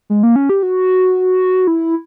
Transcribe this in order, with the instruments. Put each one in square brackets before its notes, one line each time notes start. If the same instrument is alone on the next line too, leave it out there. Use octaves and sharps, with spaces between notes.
[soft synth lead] G#3
A#3
C#4
G4
F#4
E4